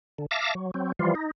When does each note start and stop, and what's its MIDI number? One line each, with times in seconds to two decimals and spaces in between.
0.18 0.26 50
0.31 0.54 76
0.31 0.54 77
0.31 0.54 81
0.31 0.54 86
0.31 0.54 94
0.55 0.71 54
0.74 0.92 54
0.74 0.92 60
0.99 1.15 52
0.99 1.15 53
0.99 1.15 55
0.99 1.15 65
1.15 1.31 63